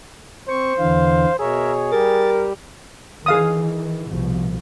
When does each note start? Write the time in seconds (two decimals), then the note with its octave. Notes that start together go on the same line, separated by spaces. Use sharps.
0.49 C4 C5 C#6
0.79 E2 D3 E3 F5
1.39 B2 G#4 A#4 C#5 E5
1.92 G3 G4 A#4 A6
3.26 D#3 E3 G#4 F5 D#6
4.10 C2 B2 F3